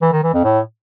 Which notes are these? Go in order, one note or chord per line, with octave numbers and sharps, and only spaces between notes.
E3
D#3
E3
F2
A2